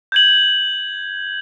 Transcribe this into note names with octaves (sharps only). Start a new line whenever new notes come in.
G6 G#6 F#7